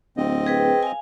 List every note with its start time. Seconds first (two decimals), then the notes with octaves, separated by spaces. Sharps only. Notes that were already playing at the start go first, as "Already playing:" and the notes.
0.17 D1 C4 D#5
0.46 G#4 B4 G5
0.83 F5 G#5